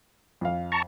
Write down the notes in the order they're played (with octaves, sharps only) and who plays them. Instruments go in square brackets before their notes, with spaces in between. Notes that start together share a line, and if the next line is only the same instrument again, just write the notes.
[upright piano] F2 F5
[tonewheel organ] A5 A#5 C#6